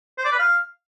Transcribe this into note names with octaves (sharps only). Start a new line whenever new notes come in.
C5
D5
B4
F5